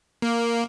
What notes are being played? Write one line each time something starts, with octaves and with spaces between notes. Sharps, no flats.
A#3